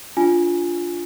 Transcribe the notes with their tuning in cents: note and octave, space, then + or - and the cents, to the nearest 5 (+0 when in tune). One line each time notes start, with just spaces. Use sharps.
D4 -10 F4 +0 G#5 +0